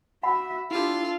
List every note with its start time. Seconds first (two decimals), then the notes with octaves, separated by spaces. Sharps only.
0.23 F#4 E5 F#5 B5
0.71 D4 E4 F4 G4 A4